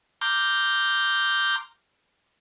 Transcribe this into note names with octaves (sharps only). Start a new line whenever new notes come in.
A#5 C6 D6 F6 G6